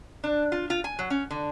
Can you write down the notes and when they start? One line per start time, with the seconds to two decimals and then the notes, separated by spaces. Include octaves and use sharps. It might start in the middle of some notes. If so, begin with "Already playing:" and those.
0.24 D4
0.52 F4
0.70 F4
0.84 G#5
0.99 F#3
1.10 C#4
1.31 D3